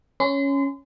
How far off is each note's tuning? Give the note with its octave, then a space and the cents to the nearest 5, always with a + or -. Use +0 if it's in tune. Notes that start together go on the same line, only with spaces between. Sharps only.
C#4 +0 C6 -35